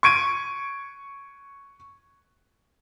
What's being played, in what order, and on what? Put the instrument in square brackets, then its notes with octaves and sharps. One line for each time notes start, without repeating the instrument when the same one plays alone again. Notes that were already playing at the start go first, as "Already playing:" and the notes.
[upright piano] C#6 G#6 D7 D#7